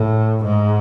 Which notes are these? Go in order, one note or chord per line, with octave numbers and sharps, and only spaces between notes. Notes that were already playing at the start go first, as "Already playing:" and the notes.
Already playing: A2
G#2